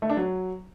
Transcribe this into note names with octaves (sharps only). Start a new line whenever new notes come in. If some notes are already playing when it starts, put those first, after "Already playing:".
A3
D4
F#3